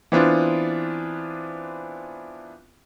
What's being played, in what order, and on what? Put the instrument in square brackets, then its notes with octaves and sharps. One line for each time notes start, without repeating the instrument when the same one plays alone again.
[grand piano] E3 B3 C4 D4 F4